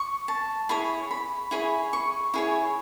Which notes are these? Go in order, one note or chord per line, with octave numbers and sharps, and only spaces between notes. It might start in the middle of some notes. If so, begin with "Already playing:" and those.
Already playing: C#6
A5
E4 G#4 C#5 B5
B5
E4 G#4 C#5 B5
C#6
E4 G#4 C#5